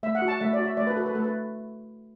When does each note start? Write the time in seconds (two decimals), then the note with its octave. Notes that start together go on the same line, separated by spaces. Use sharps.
0.03 A3 E5
0.15 F#5
0.22 F#4
0.28 A5
0.41 A3 E5
0.53 D5
0.59 F#4
0.65 E5
0.77 A3 D5
0.87 B4
0.96 F#4 A4
1.06 B4
1.15 A3 A4
1.24 B4